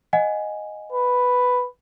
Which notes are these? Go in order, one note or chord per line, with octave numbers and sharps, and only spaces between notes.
D#5 F#5 G#5
B4